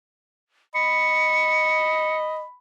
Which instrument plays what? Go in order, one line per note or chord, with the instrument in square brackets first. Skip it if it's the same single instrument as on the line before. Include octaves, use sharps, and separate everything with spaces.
[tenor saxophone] D#5 [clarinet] B5 [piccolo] C#7